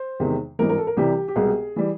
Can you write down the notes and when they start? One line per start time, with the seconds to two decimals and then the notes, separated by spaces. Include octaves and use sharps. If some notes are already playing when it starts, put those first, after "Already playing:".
Already playing: C5
0.20 E2 C3 D#3 G#3
0.59 G#1 G2 E3 A#4
0.69 A#4
0.78 A4
0.87 A#4
0.97 C2 C3 E3 G3 G4
1.28 G4
1.36 C2 B2 G#3 B3 G#4
1.76 E3 G3